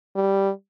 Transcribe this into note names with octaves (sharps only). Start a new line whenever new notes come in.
G3